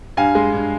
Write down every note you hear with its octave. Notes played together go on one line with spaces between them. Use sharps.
G2 F5 G#5
G#3
G2